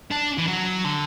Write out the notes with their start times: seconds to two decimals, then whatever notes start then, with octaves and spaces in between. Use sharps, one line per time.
0.11 D4
0.38 E3
0.47 F#3
0.84 D3